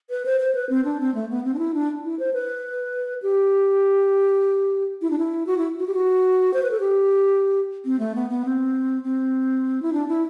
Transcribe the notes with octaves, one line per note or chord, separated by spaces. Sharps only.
B4
C5
C5
B4
C4
D4
C4
A3
B3
C4
D4
E4
D4
E4
C5
B4
G4
E4
D4
E4
F#4
E4
F#4
G4
F#4
C5
B4
A4
G4
C4
A3
B3
B3
C4
C4
E4
D4
E4